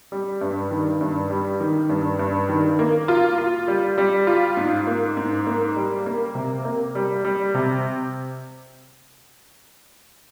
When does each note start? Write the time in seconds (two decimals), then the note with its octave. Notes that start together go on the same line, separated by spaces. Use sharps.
0.12 G3
0.41 G2
0.71 D#3
1.01 G2
1.30 G3
1.60 D#3
1.89 G2
2.19 G2
2.49 D#3
2.79 A#3
3.08 F4
3.38 F4
3.68 G3
3.98 G3
4.27 F4
4.57 G#2
4.87 A#3
5.17 G#2
5.47 A#3
5.76 G3
6.06 A#3
6.35 C3
6.65 A#3
6.95 G3
7.25 G3
7.54 C3